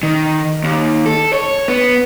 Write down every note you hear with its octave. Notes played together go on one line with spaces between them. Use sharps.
D#3
D#2
A4
C#5
B3